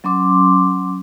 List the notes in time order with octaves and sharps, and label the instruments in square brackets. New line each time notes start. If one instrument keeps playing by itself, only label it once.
[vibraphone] F#3 C#4 C6 D6